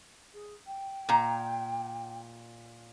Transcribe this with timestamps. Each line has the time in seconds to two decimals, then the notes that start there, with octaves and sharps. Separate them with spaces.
0.34 G#4
0.67 G5
1.09 A#2 A#5